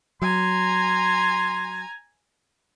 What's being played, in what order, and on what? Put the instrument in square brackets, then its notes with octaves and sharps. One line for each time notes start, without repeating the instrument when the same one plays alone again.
[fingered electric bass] F#3 [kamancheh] G#5 A#5 [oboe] C6